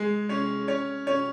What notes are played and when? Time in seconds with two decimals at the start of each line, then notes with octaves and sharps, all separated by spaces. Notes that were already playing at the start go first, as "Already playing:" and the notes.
Already playing: G#3 G#4
0.29 C#4 C#5
0.68 C#4 C#5
1.07 C#4 C#5